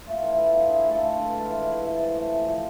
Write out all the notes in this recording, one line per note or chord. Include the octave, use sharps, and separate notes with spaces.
A3 F4
E3
E4
A3
F4
D4
D3 E4 G#4
A3
F4 A4
A3
F4 A4
D3
B4
G#3 F4 A4
E3
E3 E4 G#4
E3
C3 A4 C5
A3
C3
F3